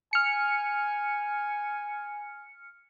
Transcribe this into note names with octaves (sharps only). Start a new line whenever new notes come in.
G#5 F6 C#7